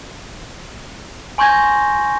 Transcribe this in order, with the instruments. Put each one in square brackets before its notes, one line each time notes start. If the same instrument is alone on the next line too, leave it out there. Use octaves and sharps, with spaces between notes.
[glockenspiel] G#5 C6 C#6 G6 G#6 A#6